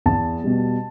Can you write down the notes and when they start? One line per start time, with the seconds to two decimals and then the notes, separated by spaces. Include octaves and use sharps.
0.06 E2 A5
0.44 B2 G3